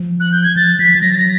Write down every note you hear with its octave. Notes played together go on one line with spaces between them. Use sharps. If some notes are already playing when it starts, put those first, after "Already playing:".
Already playing: F3
F#6
G6
G#6
F3 A6
F3 B6
F3 A6
F#3 A#6
A6
A#6